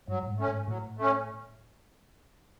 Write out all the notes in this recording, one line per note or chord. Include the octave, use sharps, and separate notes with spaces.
G2 F#3
G2
G#2
A3 C#4
G#2
A2 F#3
A3 C#4